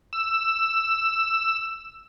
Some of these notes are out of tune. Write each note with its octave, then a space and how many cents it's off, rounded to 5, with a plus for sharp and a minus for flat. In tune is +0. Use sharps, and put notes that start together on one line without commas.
E6 +10